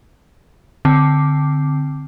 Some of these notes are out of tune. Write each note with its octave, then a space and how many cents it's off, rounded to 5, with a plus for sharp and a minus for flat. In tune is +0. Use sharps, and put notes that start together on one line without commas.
D3 +0 C4 +0